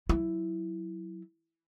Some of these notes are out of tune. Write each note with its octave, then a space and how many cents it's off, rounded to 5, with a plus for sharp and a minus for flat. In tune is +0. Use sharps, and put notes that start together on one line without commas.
F#3 +0 E4 +0